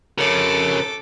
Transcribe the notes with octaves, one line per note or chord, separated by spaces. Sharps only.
C#3 A4 A#4 C#5 D6